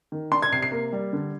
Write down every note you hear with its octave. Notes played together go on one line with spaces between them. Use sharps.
D#3
D4 C6
G#6
C3 C7
C7
A#3
G3
D3